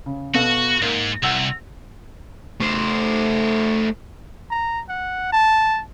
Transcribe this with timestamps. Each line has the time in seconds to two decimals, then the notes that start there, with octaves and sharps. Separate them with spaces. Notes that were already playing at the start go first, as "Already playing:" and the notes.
0.06 C#3
0.35 B2 F#4 A4 F5
0.82 G#2 A#3
1.23 C2 F#5 E6 F7
2.61 A3 C5
4.51 A#5
4.89 F#5
5.32 A5